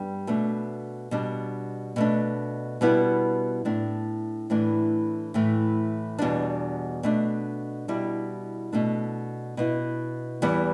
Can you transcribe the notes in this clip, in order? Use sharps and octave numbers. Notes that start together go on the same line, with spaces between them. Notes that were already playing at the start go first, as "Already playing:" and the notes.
Already playing: G2 G3 B3 D4
B2 A3 D4
B2 G3 D4
B2 A3 D4
B2 G3 B3 E4
A2 A3 D4
A2 E3 A3 D4
A2 E3 A3
E2 B2 G3 D4
B2 A3 D4
B2 G3 E4
B2 A3 D4
B2 B3 E4
E2 E3 G3 B3